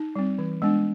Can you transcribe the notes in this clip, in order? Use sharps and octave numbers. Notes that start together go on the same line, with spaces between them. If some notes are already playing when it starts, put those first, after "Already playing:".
Already playing: D#4
G3 C4
E3
G#3 B3 D4